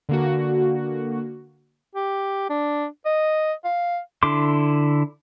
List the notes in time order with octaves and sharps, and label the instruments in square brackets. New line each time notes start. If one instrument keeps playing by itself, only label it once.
[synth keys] D3 A#3 F#4
[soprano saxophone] G4
D4
D#5
F5
[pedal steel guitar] D3 E4 C6 D6